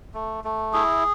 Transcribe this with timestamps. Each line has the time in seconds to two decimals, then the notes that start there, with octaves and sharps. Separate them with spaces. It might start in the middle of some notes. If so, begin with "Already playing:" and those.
0.14 A3
0.44 A3
0.73 E4 G#4